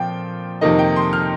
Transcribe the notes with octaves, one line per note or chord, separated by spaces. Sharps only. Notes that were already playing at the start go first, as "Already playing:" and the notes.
Already playing: A#2 F3 C4 G5
F2 C3 D#3 A#3 D#4 D#5
G5
C6
F6